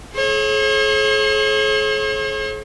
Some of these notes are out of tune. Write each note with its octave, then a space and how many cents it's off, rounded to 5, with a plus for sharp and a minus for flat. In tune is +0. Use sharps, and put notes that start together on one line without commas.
G#4 +45 C#5 -45